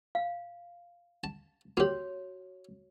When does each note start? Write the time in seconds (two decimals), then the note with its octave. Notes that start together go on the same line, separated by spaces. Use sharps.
0.15 F5
1.24 A5
1.77 A#3 F#4 G4 C#5